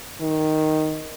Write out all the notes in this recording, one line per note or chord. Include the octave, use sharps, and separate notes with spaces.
D#3